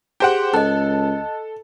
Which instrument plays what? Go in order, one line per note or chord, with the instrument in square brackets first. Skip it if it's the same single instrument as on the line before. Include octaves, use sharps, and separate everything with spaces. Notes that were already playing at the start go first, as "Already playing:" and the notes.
[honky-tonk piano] G4 C5 F#5 [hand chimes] G#4
[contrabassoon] C#2 [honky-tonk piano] A4 [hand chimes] D#5 F#6